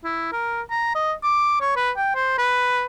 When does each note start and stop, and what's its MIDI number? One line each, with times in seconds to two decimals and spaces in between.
0.04 0.28 64
0.33 0.62 70
0.70 0.94 82
0.95 1.12 75
1.23 1.59 86
1.61 1.73 73
1.76 1.91 71
1.97 2.13 79
2.15 2.38 72
2.38 2.85 71